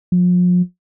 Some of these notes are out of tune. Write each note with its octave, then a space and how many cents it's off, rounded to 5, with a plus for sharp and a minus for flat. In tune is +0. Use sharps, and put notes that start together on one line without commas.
F3 +40